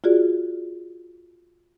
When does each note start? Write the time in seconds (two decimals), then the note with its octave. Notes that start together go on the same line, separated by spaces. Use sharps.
0.04 F4 F#4 G#4 D5